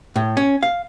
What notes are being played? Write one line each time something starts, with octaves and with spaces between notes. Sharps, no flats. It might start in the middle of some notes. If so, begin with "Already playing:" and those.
A2
C#4
F5